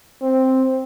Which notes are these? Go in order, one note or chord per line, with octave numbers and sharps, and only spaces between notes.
C4